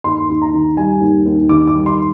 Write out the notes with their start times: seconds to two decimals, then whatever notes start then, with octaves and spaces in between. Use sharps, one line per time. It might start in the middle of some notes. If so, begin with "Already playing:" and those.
0.04 D#2 C6
0.29 D#2
0.42 A#5
0.53 D#3
0.77 G3 G#5
1.01 D#2
1.26 D#2
1.49 D#3 D6
1.67 D6
1.74 G3
1.86 C6